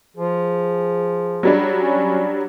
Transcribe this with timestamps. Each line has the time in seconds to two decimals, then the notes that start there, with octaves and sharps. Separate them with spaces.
0.17 F3 G#4
1.43 F#3 G3 D4
1.78 C#4